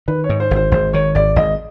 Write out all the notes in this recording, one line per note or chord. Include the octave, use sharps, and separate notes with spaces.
D#3 B4
C#5
G#2
C5
G#1
C5
G#1 C5
D#3 C#5
G#1 D5
G#1 D#5